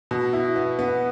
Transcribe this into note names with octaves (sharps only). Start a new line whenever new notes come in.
B2
E4
B3
B3